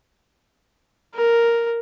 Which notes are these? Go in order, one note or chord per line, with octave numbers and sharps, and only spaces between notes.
A#4